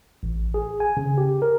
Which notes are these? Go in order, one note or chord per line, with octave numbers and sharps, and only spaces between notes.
A1
G#4
G#5
C#3
G4
A#4